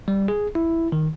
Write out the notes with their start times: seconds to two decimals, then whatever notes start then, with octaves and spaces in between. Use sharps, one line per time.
0.08 G3
0.28 G#4
0.55 E4
0.92 D#3